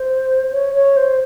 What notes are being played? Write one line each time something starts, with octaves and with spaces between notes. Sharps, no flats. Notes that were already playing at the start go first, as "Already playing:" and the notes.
Already playing: C5
C#5
C#5
C5